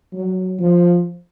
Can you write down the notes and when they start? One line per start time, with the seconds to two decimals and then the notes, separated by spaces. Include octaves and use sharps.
0.13 F#3
0.59 F3